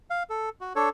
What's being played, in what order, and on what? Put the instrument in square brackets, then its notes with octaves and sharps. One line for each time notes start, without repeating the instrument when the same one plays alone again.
[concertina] F5
A4
F#4
D4 A4 C#5